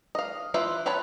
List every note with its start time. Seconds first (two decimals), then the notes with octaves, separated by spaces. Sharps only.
0.15 D#5 F5
0.54 E3 F4 B4 C5 E5
0.86 F4 B4 C#5 A5 B5